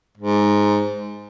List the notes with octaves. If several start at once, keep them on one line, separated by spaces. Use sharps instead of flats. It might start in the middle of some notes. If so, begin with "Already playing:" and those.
G#2